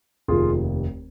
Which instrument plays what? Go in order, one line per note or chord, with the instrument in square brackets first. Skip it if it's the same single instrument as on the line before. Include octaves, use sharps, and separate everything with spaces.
[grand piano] F1 D#2 D#3 F4 G#4